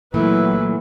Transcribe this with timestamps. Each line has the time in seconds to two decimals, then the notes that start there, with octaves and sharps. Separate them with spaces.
0.14 A#2 E3 F#3 A3 E4 B4